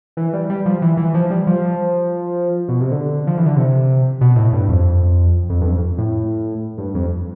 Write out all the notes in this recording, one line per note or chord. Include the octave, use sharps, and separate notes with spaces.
E3
G3
G3
F3
E3
E3
F3
G3
F3
B2
C3
D3
F3
E3
D3
C3
B2
A2
G2
F2
F2
G2
F2
A2
G2
F2